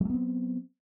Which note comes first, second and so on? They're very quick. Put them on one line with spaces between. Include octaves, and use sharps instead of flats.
F#3 A3 B3 C4